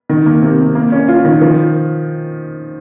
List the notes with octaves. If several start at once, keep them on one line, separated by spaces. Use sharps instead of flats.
D#3
A#3
C3
C3
A#3
C#4
F4
D#3
F3